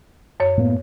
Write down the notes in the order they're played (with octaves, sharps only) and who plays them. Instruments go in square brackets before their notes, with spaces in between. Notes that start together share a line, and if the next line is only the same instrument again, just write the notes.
[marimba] F#2 C#5
[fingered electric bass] A2 A#3 B3